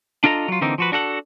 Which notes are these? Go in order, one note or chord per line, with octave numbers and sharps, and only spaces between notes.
D4 F4 A4 D#5 A#5
F#3 F4
D3 E3 A#3 C4 D#4
F3 F#4 B4
D4 F#4 A4 F#5